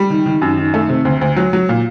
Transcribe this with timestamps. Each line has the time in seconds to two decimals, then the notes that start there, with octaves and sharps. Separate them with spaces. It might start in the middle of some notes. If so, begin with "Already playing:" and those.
Already playing: G3
0.10 D#3
0.26 D#3
0.42 F#2
0.58 D#3
0.74 A3
0.89 C3
1.05 D2
1.21 D2
1.36 F#3
1.53 F#3
1.69 A#2